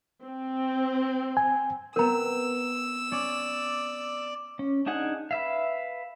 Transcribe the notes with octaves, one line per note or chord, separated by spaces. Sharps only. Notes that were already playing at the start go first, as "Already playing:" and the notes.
C4
G#5
B3 C4 A#4 A#5 E6
C#4 D5
C#4
D4 D#4 G#4 F#5 G#5
B4 E5 F5